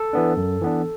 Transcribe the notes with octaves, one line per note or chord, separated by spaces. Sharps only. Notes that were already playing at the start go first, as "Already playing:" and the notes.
Already playing: A4
E3 B3 D4
F#2
E3 B3 D4